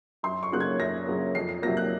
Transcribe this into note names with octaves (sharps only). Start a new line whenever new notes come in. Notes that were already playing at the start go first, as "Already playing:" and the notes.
F#2 C6
C#6
C#3 F#3 A#3 F#6
G#6
F#2 A#6
C#3 F#3 A#3
F2 C7
C7
C3 F#3 A#3 A#6
F#6